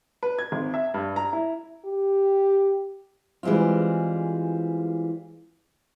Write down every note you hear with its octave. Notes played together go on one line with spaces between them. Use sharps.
B4
G#6
G#1
E5
G2
A#5
E4
G4
E3 G3 G#3 C4 F4